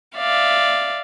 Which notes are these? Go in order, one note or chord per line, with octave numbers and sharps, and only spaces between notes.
D5 E5 F5